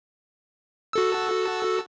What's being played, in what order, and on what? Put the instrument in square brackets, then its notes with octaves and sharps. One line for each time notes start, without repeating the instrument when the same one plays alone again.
[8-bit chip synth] F#4 A4 E6